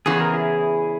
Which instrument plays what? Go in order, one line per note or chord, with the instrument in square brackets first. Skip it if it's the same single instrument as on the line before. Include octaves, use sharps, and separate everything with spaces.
[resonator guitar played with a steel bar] E2 C#3 E3 [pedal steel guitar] G#4
[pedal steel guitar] A#4
E4 G#4